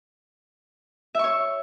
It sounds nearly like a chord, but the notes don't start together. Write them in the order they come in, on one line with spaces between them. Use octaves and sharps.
E5 C#6 C#5